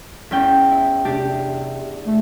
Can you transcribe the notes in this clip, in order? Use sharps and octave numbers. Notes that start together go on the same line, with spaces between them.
E2 C#4 G5
E4
C3 D4 G4
A3